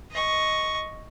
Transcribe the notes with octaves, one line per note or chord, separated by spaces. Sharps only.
D#5 C#6